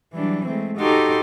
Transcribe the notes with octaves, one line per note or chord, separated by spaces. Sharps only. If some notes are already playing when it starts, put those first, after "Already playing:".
E3 F#3 G3 D4
G#3 A3 C4
D#4 F#4 G4 A4 C6 D6